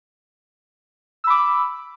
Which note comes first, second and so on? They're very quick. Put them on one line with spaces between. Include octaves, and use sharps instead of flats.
E6 B5 D6